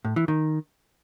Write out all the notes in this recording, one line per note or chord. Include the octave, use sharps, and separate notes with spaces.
A2
E3
D#3